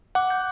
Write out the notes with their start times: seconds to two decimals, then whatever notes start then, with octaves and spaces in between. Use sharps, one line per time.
0.15 F#5 D6
0.30 G6